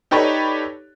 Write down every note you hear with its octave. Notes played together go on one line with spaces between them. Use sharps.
D#4 G4 A4 B4 C#5 D5